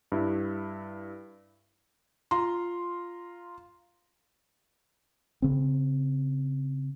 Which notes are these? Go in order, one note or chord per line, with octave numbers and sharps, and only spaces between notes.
G2 E4
F4 F5 A#5 C6
C#3 C4